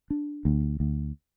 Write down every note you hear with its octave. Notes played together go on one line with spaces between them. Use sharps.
D4
D2
D2